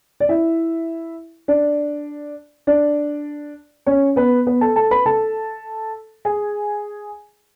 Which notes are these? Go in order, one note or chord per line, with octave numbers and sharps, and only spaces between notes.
D5
E4 E5
D4 D5
D4 D5
C#4 C#5
B3 B4
B3 B4
A4 A5
A4 A5
B4 B5
A4 A5
G#4 G#5